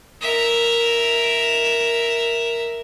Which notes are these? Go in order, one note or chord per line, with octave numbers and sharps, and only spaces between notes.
A#4 E5